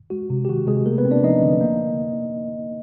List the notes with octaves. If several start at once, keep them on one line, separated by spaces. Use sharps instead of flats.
G#3 F#4
C3
G4
D#3 F#4
C3 G#3 G#4
A3 A#3 A#4
B3 B4
C4
D4 D5
F3 D#4 D#5
D3
A#3